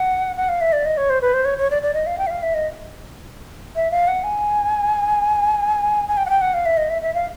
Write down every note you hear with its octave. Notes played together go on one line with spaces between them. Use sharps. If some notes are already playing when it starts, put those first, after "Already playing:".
Already playing: F#5
F#5
F5
E5
D5
D#5
C#5
C5
B4
C5
C#5
C#5
D5
D5
D#5
F5
G5
E5
F5
E5
D#5
E5
F5
F#5
G#5
G#5
G5
F#5
G5
F#5
F5
E5
D#5
E5
E5
F5